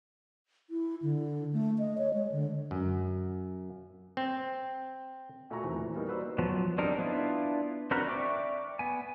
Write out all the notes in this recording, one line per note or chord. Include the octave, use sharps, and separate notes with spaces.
E4
D3
A3
D#5
C#5
G#3
D3
F#2
C4
A#2 A3 F#4 G#5 A#5 C#6
E2 C3 D#3 A3
E3
G3 A#3 B3 D#4
F#4 B4 C5 D5 E6
F3 F#3 B3
G3 C4 D4 D#4 A#4
B3 D4 E4 F4
C4 D4 F#4 A#4 B4
D5 E5 G5 C#6 D6
B3 G#5